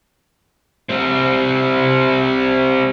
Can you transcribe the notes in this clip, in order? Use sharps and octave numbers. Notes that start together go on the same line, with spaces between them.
G3 C4